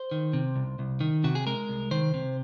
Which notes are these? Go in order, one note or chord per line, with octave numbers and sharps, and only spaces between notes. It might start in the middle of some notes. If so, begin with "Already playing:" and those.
Already playing: C5
D#3
C3
C2
C2
D#3
C3 F#4
G#4
G#3 A#4
C2
D#3 C5
C3